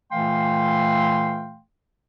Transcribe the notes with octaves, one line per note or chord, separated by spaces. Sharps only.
A#2 E3 A3 F5 G5 C6